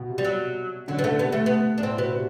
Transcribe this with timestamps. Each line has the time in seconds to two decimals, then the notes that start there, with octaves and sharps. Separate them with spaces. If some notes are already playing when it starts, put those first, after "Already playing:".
Already playing: B2
0.09 C3
0.18 G3
0.25 F#3
0.88 D3 F#3
0.99 B3
1.04 D3 A3
1.19 C3 B3
1.32 A3
1.46 B3
1.78 D4
1.83 A2 C4
1.98 B2 B3
2.14 C3